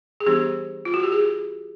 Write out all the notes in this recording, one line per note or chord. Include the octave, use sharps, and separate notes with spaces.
G#4
E3 G3 B3 D4 G4
F4
F#4
G4
G#4